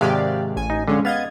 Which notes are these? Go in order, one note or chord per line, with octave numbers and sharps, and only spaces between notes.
G#1 C3 G#3 G4 D5 F5
A1 G#5
D#4
F2 D3 G#3 C#4
B3 D#5 F5 G#6 A6